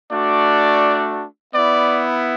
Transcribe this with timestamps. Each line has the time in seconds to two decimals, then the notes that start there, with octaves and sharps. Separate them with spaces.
0.11 A3 D4 F#4 D5
1.54 B3 E4 D5